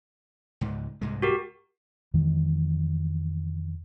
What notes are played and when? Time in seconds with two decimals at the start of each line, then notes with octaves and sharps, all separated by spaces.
0.61 C#2 G#2
1.01 C2 G#2 G#3
1.22 F#4 G4 A#4
2.14 F2 D#3 E3 G#3